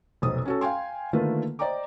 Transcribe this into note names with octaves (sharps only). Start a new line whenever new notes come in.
F1 B1 C5 D#6
C#4 F#4 A4
F5 G5 G#5 C6
D3 D#3 A3 A#3 F4 B4
C5 D5 D#5 G5 A#5 D6